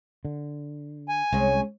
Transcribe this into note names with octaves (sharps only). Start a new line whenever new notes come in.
D3
G#5
C2 G#3 C#4